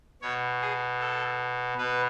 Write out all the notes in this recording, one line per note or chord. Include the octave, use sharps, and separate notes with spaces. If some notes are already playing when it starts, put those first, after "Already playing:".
B2 C#5
G#4
A4
B2 B4